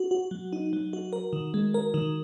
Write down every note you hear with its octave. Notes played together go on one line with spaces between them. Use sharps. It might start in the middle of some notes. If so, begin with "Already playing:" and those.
Already playing: F#4
F#4
F#3
D#4
F#3
F#4
A#4
D#3
G#3
A#4
D#3